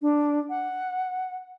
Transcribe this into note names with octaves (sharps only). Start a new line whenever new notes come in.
D4
F#5